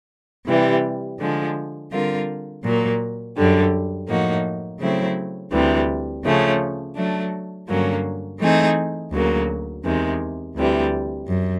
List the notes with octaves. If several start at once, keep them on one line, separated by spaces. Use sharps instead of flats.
C3 E3 G3
D3 F3 G#3
D3 G3 C4 F4 A#4
A#2 F#3 A#3
F#2 D3 G3
A2 F3 A#3 D#4 F#4
C#3 F#3 A3 C4 E4
D2 C3 E3 G3
C#3 F3 A3 C#4
F#3 A3 D4
G2 D3 F#3 A#3 C#4
E3 A3 C4 D#4 G#4
D2 C#3 F#3 A#3
E2 C3 D#3 G#3
D2 C3 E3 G3
F#2